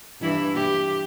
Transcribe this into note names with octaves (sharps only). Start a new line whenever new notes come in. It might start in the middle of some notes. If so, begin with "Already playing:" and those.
G2 E3 E4
G4